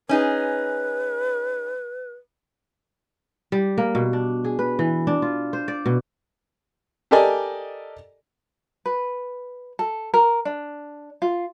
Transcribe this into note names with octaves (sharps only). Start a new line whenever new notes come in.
C#4 D#4 G#4 B4
G3
A#3
B2
D4
G#4
B4
E3
D4
F4
C5
D5
B2
G4 A4 A#4 D5 D#5 G#5
B4
A4
A#4
D4
F4